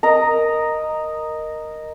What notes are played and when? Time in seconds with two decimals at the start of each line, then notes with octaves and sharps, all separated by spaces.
0.03 A#4 D#5 A#5